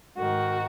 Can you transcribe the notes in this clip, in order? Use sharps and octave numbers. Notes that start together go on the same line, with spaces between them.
G#2 D#3 F#4